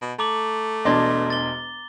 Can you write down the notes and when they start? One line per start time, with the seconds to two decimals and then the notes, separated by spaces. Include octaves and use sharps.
0.02 B2
0.19 A3 A#5 D6 F#7
0.85 E1 E2 D4 D#5 C6 G#6
1.30 A6 G7